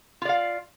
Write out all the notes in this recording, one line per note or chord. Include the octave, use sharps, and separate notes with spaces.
F4 D5 F5